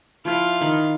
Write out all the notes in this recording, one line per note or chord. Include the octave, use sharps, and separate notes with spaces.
F3 E4 F4
D#3 B5